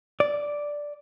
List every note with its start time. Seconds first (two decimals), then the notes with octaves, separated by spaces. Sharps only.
0.20 D5